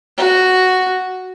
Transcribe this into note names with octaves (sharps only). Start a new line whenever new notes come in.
F#4